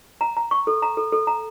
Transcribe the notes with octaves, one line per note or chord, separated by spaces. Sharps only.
A#5
A#5
C#6
A4
A#5
A4
A4
A#5